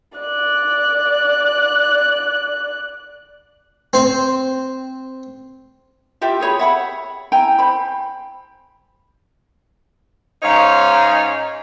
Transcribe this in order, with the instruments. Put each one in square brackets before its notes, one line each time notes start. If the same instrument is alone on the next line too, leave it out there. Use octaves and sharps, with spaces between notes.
[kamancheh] D5 F#6
[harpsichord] C4 C5
[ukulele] E4 F4 G4 E5
F#4 G#4 C#5 B5
E5 F#5 B5
E4 G5 G#5 A#5
C5 B5
[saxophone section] G#2 C#4 D#4 C#5 F5